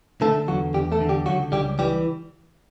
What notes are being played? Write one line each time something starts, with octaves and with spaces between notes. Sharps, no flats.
D3 A3 A4
E2 F#3 F#4
E2 G3 G4
A3 A4
D3
G3 G4
C#2 F#3 F#4
C#2 G3 G4
E3 G3 G4